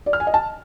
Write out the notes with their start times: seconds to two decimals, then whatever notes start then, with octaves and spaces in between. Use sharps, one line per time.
0.06 D5
0.13 F6
0.20 G#5
0.27 D#5
0.34 A5